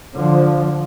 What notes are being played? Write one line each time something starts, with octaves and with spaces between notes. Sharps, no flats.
D3 F3